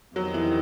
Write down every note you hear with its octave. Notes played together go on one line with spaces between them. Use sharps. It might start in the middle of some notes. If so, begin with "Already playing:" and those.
F2 C3 D#3 F#3
E3